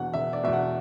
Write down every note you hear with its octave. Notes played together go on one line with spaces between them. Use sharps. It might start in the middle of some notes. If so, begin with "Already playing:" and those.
Already playing: E2 B2 F#5
E1 E5
D5
E2 B2 E5
F#5